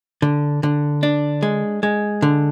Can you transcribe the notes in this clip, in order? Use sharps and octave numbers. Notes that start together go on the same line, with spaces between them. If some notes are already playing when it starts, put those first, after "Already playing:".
D3
D3
D4
G#3
G#3
D3